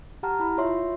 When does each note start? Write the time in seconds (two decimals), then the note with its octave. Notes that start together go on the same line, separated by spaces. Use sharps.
0.23 G4 F#5 A5 A#5 F6
0.40 E4 B5
0.57 F4 F#4 C#5 E5 C6